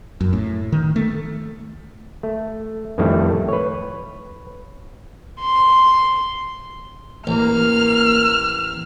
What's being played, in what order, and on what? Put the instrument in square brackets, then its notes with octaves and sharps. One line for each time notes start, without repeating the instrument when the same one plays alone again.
[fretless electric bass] F#2
A2
D#3
A3
[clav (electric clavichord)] A3
F2 A2 D#3 G3 A3
B4 C#5
[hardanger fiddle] C6
[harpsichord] A1 [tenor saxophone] A#3 [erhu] F6